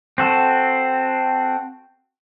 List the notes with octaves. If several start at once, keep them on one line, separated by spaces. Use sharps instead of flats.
C4 F#4 A4